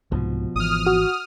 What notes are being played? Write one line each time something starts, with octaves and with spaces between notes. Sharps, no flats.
C2 G#2 B2 F3
G#1 E3 D#6 F6
F#4